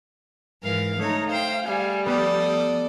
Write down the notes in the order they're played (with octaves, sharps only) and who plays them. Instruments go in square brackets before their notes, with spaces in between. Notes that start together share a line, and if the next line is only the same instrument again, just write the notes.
[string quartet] G#2 E3 [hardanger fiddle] A#4 F5
[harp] A3 [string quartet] D#4 A#5 [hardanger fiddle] C#5
[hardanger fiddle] C5 G5 [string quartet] F5
[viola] G3 [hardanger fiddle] G#4 G#5
[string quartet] F3 D#6 [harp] B3 G4 [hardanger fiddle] A4 D5